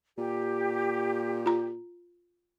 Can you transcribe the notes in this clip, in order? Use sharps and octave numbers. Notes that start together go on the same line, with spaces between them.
A#2 G4
F4 A#5